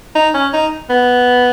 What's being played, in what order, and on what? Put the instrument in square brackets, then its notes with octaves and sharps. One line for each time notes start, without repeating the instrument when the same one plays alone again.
[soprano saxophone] D#4
C#4
D#4
B3